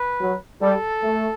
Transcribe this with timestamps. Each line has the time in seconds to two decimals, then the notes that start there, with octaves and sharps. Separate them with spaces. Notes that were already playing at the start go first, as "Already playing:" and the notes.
Already playing: B4
0.21 F#3
0.62 G3 A4
1.03 A3